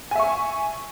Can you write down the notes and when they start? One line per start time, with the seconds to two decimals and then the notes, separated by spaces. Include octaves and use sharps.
0.11 G#5
0.15 E5
0.19 C#6